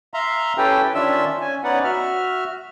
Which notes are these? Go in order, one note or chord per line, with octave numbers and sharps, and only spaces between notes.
E5 F5 A#5 C6
C#4 E4 G4 A4 B4 G5
D#3 C#4 D4 F4 E5 E6
C#4 G#5
B3 C#4 D#4 B4 D5 F#5
F#4 E5 F6